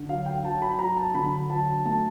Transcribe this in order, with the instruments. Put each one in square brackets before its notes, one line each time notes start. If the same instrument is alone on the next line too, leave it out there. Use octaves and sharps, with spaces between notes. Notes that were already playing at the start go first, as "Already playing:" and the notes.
Already playing: [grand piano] D3
F#3 F5
G5
F#3 A5
B5
F#3 A#5
A5
D3 B5
F#3 A5
A3 A5